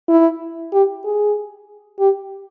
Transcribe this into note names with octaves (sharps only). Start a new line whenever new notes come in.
E4
G4
G#4
G4